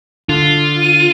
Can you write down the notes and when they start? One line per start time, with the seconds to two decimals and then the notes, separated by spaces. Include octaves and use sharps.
0.29 D3 F4
0.81 D#7